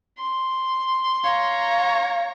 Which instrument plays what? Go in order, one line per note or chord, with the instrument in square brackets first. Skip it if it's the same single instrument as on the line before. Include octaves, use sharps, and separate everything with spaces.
[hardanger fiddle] C6
[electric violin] C#5 A#5 [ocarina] F5